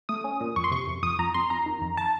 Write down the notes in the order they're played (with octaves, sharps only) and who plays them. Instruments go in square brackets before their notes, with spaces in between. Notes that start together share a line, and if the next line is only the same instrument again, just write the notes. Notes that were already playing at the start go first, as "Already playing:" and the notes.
[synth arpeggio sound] A3 D#6
C#4
A#2
F2 C#6
C6
C3 C#6
F2
F2 D#6
F2 A#5
F2 C6
F2 A#5
D#3
F2
A5